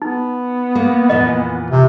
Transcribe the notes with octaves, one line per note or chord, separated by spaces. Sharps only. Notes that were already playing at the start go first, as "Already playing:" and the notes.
B3 D#4
A#3
F2 A#2 E3 D#5
C3